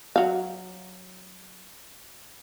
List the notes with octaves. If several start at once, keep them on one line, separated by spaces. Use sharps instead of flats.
F#3 F5